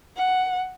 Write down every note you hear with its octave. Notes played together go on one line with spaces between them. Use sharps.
F#5